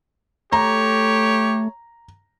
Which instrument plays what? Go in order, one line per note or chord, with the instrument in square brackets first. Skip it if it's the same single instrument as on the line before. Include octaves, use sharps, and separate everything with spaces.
[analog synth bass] A3 [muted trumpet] G4 [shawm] C#5 [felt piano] A#5